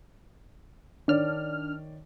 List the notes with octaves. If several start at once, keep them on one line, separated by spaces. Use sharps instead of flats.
D#3 D4 C#5 D5 F6